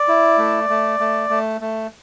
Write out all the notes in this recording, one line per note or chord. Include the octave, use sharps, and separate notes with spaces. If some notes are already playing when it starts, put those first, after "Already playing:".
Already playing: D5
E4
A3
A3
A3
A3
A3